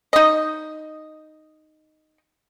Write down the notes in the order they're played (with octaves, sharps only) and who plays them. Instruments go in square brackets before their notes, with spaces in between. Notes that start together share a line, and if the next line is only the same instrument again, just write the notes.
[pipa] D#4 D#5